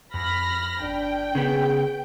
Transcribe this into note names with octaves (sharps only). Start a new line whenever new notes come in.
F2 B5 F6 A#6
G1 D4 G5
C#3 B3 G#4